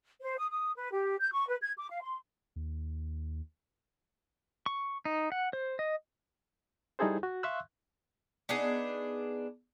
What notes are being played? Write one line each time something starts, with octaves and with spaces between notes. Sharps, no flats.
C5
D#6
D#6
B4
G4
G6
C#6
B4
G#6
D6
F5
C6
D#2
C#6
D#4
F#5
C5
D#5
G3 D#4 E4 G#4 A4 C5
F#4
E5 F5 C6 C#6 E6 F#6
B3 D4 D#4 G#4